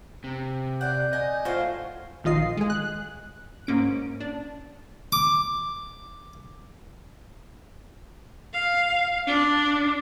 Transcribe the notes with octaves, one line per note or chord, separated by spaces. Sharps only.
C3
D5 F#5 G6
D#5 G#5
A2 F4 F#4 C5 F5
A#1 D#3 F4 D#5 C7
G#3 G#4
F#6
G#2 A#3 C#4 D7
D4
D6
F5
D4